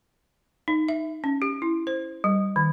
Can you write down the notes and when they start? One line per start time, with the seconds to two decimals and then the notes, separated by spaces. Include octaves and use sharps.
0.68 D#4
0.89 E5
1.24 C#4
1.42 G4
1.62 E4
1.87 C5
2.24 G3
2.56 D#3